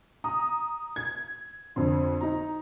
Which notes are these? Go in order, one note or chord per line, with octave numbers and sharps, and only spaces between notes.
A#5 D#6
G#6
F2 D3
D#4 A#5